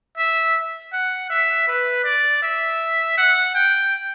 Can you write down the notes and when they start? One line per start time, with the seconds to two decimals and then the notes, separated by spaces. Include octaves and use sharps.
0.18 E5
0.93 F#5
1.30 E5
1.68 B4
2.05 D5
2.43 E5
3.18 F#5
3.55 G5